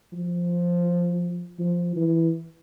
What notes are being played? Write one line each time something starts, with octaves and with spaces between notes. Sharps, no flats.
F3
F3
E3